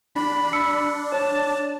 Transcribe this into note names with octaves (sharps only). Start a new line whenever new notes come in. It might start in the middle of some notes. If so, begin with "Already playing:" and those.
D4 B5
E6 C#7
C#5 A5